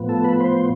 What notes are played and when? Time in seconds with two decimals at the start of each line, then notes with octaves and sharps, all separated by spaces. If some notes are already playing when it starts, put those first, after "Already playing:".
Already playing: A2 F3 B3
0.09 A4
0.24 B4
0.41 C5